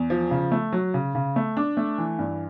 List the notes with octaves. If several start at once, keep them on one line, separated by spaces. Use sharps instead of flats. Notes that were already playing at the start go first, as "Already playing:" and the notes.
Already playing: E2
F3
C#3
A3
F#3
C#3
C#3
A3
D4
A3
E3
G2